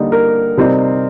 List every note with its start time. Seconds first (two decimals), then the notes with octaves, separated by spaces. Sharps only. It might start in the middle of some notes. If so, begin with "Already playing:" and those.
Already playing: D3 G3 A#3 D#4
0.12 A#4
0.57 C3 G3 C4 D#4